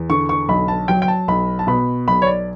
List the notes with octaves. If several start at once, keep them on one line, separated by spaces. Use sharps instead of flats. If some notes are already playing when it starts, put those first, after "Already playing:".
Already playing: E2
D3 C#6
C#6
B1 B5
A5
F#3 G5
G5
A5
B1 B5
A5
B2 B5
B1 B5
C#5
D5